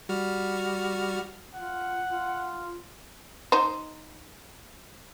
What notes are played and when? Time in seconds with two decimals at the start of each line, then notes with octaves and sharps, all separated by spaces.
0.09 G3 F#4 F6
1.54 F4 F#5
2.09 F4
3.52 D#4 C5